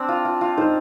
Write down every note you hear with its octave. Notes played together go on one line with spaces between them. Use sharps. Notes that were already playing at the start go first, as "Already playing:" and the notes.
Already playing: C4 D4 C5
F4
F4
F4
D#4 C5